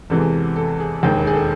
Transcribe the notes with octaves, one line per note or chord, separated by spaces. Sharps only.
E2 C3 E3 G#3 A4
A4
G#4
E1 D#2 D#3 G#3
G#4
A4